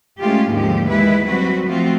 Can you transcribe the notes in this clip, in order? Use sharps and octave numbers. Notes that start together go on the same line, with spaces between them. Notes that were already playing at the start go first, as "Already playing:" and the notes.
G#3 A3 C#4 F4 G4
D#2 G#2 D3 F3 G#3 G4
E3 G#3 A#3 E4 B4
F#3 G3 C4 F#4 B4
F3 A3 C4 F4 F#4